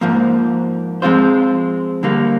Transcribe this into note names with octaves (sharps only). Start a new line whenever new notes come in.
G#2 F3 A#3
F3 G#3 C4 F4 C5
D3 G3 A#3